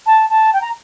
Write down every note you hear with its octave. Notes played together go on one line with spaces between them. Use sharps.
A5
A5
G5
A#5